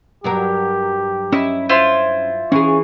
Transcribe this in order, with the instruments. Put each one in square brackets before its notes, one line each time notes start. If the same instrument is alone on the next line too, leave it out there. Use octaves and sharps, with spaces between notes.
[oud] G2 F#3 A#4 [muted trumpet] G4
[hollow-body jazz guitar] C#4 D#5 [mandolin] E4
[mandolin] E4 F4 C5
[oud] E3 G#4 [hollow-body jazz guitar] C#4 [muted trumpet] C#6